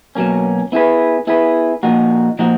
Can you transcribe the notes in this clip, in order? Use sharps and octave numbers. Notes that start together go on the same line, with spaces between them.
B2 F#3 A#3 C#4
B3 E4 G#4 B4
B3 E4 G#4 B4
A#2 F3 A#3 D#4 F#4
A#2 F3 A#3 D#4 F#4